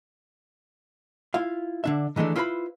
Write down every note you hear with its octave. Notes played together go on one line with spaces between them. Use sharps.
E4 F4 F5
D3 D4 E5
D#3 E3 G#3 A3 D4
E4 F4 B4 C5 A5 B5